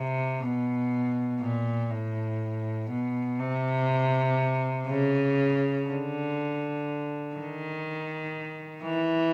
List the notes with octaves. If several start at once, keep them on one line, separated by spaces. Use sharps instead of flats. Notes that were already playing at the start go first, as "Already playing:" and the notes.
Already playing: C3
B2
A#2
A2
B2
C3
C#3
D3
D#3
E3